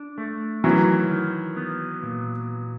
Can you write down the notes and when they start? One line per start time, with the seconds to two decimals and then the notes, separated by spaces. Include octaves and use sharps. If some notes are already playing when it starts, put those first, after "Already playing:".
Already playing: D4
0.18 A3
0.64 D#3 E3 F#3
1.11 D#3
1.57 B3
2.03 A#2